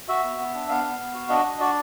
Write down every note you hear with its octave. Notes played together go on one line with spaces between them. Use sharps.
F#4 E5
B3
B3
D4
B3 F5
B3
B3
F#4
D4 D#5
D4
F#4 D5